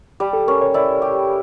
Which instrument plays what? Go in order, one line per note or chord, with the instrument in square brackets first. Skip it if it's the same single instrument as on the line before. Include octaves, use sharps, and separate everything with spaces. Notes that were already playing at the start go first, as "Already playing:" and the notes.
[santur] G3 [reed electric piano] G4
[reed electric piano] A4
[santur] C#4 [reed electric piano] A#4
[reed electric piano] C#5
[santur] E4 [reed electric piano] D5
[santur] G4